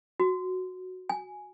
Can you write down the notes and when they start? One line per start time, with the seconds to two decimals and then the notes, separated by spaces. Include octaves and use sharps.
0.20 F#4
1.09 G#5